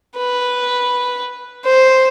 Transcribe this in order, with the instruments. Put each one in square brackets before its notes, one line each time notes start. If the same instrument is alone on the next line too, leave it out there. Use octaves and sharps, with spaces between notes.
[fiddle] B4
C5